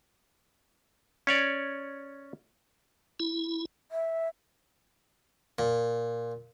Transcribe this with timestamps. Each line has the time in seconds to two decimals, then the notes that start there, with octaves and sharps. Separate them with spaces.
1.27 C#4 C#5 D5
3.20 E4
3.91 E5
5.59 A#2